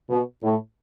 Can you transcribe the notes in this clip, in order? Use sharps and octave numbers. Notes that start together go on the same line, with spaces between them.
B2
A2